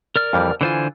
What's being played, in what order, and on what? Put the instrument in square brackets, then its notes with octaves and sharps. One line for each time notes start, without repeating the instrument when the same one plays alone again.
[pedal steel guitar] A#4 D5 F6
[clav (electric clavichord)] F2 E3 G3
[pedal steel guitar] D3 C5 G#5 [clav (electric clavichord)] E3 F4